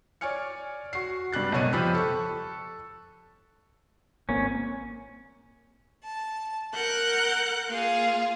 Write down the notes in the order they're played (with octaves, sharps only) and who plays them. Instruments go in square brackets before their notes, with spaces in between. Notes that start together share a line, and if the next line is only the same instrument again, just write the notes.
[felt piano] C#5 D5 G#5 F6 C#7
F#4 C7
G2 G3 G4 F#6 A6
B1 F#2 B2 C#5 D#5 D#7
F3 G4 C5 B5 E6 F#6
A4 C#6
[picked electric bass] G#1 A#3 C4 [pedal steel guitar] C#4
[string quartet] A5
A#4 F#5 F#6 G6
A#3 F4 G#4 F5